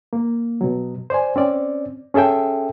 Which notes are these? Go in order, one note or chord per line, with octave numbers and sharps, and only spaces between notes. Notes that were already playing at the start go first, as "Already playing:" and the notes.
A#3
B2 F#3
C5 D5 G#5
C4 C#4 D5
C#4 G#4 A4 E5 G5